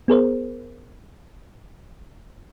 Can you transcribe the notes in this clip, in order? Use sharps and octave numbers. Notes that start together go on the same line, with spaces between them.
B3 G#4 A#4 C5